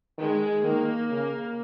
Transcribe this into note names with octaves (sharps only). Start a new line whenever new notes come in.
D#3 G#3
D#3 A#3
C#3